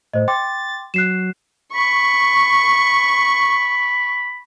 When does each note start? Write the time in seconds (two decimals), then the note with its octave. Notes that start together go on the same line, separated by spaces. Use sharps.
0.14 A2 C5 D#5
0.28 G5 C6 D6 A6
0.94 F#3 F#6 C7 E7
1.75 B5 C#6